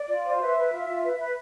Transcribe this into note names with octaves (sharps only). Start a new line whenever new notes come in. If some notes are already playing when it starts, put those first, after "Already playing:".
Already playing: D5
F4
C5
B4 E5
B4
F4
F4
B4
B4